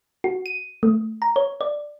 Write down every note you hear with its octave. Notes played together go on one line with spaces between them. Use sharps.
F#4
D#7
A3
A#5
C#5
D5